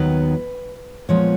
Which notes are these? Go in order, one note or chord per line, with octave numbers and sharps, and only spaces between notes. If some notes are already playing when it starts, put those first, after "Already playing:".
Already playing: D#2 D#3 F#3 B3 B4
A#2 F3 G#3 B3 C#5